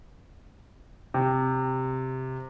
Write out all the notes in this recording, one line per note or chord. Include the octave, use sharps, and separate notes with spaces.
C3